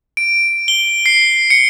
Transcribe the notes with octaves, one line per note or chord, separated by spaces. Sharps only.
D7
G7
C7
C#7